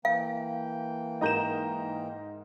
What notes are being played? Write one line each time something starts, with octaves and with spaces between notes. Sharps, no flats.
E3 A#3 F5 G5
G#2 A#4 D#5 A#5 G6 E7